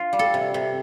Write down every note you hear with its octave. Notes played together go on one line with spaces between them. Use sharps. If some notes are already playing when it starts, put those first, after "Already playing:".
Already playing: F4
G3
A4
C3
C3